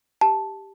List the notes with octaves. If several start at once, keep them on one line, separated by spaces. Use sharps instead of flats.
G4 A5